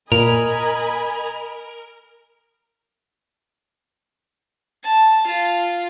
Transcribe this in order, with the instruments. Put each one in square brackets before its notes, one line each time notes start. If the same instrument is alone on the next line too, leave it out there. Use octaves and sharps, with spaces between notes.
[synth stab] A#2 [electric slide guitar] A#4 [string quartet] D#5 G#5 B5 [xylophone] F7
[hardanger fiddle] A5
F4